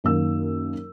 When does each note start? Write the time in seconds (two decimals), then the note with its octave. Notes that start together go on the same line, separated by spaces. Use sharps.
0.04 F#2 D#3 A#3 E6